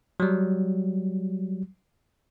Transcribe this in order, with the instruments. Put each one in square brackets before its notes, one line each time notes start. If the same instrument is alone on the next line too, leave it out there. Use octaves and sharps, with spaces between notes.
[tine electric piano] F#3 G3